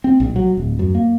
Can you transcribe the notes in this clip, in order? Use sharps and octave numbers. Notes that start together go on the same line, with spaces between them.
C4
A#1
F#3
D1
F#2
A#3